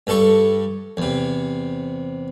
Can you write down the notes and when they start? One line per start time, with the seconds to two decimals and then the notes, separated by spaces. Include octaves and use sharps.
0.07 G2 A4 C#6
0.97 E2 C3